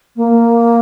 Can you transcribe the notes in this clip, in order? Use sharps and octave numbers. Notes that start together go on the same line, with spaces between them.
A#3